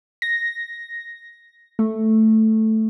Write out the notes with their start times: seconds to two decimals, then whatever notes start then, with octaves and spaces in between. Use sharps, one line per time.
0.22 A#6
1.79 A3